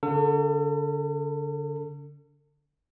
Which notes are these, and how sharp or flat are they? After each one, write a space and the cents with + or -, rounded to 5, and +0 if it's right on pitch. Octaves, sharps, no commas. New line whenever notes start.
D3 -35 A4 +40